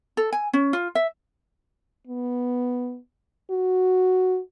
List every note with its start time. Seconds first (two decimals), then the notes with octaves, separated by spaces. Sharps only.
0.17 A4
0.33 G#5
0.53 C#4
0.73 F4
0.95 E5
2.07 B3
3.50 F#4